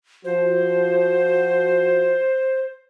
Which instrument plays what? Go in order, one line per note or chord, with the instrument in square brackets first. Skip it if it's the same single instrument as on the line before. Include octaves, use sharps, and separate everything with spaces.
[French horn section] F3 F#4 [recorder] C5